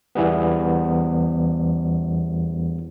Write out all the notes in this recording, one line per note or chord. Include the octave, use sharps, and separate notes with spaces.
E2 E3 G3 B3